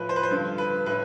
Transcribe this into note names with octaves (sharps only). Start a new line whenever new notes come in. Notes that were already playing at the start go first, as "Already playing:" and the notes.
Already playing: A2 F3 B4
C5
B4
C5
G2 D3 F3
B4
A2 B4